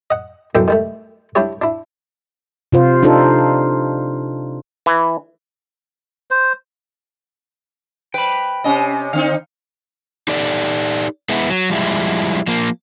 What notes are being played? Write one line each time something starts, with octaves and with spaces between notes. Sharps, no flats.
D#5 F#5
F#2 B2 E3 D4 A4 G5
D#3 G3 A3
G3 D4 E4 G4 C#5
D4 E4
C3 F4 C5
D4 D#4 F4 A4 C5
E3
C5
B4 G5 B5
C3 C#4 D#5
D3 C4 D#4 F5
D#4 G4 A4 D5
G#3 B3 E4
F#3
F3 G3 G#3 E4
F3 A#3